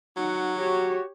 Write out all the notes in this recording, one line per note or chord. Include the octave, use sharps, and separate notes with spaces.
F#3 D#4 F#5
F#4 G4 C#5